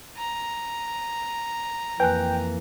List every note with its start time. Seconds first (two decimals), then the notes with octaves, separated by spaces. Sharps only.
0.18 A#5
2.00 F2 E3 A#3 B4 G5 G#5 F#6